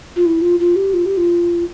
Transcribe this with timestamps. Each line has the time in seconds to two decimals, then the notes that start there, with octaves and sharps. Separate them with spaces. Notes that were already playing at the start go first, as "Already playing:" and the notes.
0.16 F4
0.26 E4
0.42 F4
0.60 F4
0.76 G4
0.94 F4
1.06 G4
1.17 F4